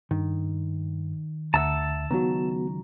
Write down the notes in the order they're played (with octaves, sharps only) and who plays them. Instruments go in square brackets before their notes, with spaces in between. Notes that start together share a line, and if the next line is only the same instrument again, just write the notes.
[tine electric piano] G2 [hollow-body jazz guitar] D#3
[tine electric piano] D2 E5 [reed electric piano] D3 [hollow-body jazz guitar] F#5 A#5 [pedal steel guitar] A5 E6
[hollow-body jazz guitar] C#2 D#3 F#3 [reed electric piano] B3 F#4 [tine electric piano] A#5